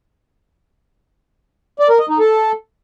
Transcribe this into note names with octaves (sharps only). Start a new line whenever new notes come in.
D5
A#4
D#5
D#4
A4